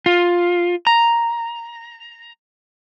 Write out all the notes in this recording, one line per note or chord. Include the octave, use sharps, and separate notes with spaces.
F4
A#5